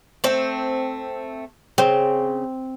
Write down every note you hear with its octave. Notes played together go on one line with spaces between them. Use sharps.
A3 C4
C#3 C4